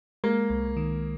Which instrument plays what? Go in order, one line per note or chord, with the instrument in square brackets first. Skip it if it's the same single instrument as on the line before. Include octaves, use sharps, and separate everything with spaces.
[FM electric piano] G#3 [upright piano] A#3
[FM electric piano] C2
D#3